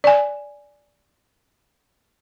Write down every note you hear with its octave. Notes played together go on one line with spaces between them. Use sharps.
D5 G#5